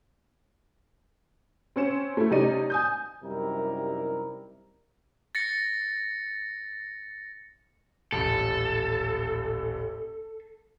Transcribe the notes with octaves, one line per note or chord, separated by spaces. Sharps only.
C4 C#4 C#7 E7
A3 E4
C3 G3 C#4 D#4 D5 D#7
G#5 D#6 G6
F#2 C3 G3 D#4 E4 A#4
A6 A#6 C#7
D#1 A1 A4